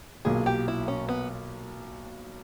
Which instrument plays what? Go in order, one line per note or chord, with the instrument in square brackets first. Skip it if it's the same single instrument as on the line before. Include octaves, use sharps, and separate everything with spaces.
[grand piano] B1 A#2 A#3 [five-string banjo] G#4
[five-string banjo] G4
E4
C#4
B3